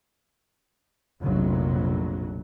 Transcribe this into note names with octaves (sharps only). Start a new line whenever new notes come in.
F1 A#1 F2 C3 F#3